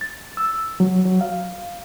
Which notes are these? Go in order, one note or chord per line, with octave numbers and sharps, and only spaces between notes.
A6
E6
F#3
F#3
F5